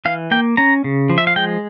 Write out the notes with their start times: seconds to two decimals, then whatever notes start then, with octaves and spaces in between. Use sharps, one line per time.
0.05 E3 F5
0.31 A#3 G5
0.57 C#4 A#5
0.84 C#3
1.10 F3
1.18 E5
1.27 F5
1.36 G#3 G5